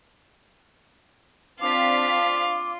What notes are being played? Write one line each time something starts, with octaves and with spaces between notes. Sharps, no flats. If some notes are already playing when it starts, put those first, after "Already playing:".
C4 D4 F4 F5 D6 B6